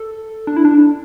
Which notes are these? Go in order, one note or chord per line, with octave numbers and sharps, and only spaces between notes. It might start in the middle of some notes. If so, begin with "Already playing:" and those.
Already playing: A4
D4
E4
D4